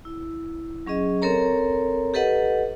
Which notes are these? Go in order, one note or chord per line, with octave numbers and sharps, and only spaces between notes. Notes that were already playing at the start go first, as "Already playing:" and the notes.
E4
F#3 C#4 G#4 D#5
C4 A4 A#4 C#5 A#5
G4 A4 B4 D#5 F#5